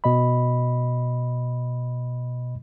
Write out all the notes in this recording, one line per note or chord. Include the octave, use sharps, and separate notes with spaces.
B2 D#5 B5